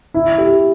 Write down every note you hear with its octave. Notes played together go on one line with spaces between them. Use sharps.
E4
G4